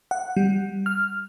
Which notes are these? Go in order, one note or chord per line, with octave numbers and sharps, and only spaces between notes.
F#5
G3
F6